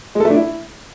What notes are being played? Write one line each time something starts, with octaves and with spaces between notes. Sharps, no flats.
G#3
A4
A3
D4
E4